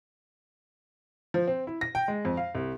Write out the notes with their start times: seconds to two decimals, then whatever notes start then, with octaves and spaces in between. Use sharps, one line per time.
1.34 F3
1.47 C4
1.67 E4
1.81 A#6
1.95 G5
2.08 G#3
2.25 F2
2.37 F5
2.55 C2